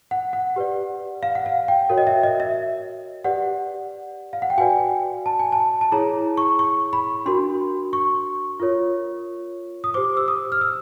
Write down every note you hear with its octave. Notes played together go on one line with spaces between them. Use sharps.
F#5
F#5
G4 B4 D5
F5
F#5
F5
G5
F#4 A#4 C#5
D#5
E5
D#5
E5
G4 B4 D5 F#5
F5
F#5
G5
F#4 B4 D5 G#5
A5
G#5
A5
A5
E4 G#4 C#5 A#5
C#6
C#6
B5
D4 F#4 A#4 C6
C#6
F4 A#4 C#5
D#6
G4 C5 D6
E6
D#6
F6
E6